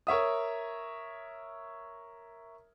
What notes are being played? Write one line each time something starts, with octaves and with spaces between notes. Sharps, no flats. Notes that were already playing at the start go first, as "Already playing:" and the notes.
A#4 C#5 E5 D#6